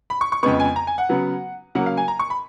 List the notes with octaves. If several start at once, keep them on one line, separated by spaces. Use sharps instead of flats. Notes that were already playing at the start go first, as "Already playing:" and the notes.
B5
C#6
C#6
F2 C#3 G#3 B3 C#6
G#5
A#5
G#5
F#5
C#3 F#3 B3
C#3 F#3 A#3 F#5
F5
G#5
A#5
C#6
B5